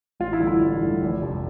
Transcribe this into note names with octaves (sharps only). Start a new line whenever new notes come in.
A1 F4
E4
G2 D3
E4
A1
G2 D3
F1
F2 C3 F3